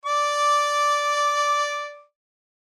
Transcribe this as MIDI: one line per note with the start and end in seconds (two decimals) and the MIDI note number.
0.06 2.02 74
0.06 2.02 86